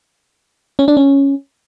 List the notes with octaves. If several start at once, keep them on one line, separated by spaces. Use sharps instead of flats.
C#4
D4
C#4